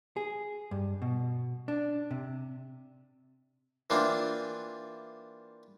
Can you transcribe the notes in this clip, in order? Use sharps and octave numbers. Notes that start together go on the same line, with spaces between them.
G#4
G2
B2
D4
C3
E3 A#3 C4 D4 F4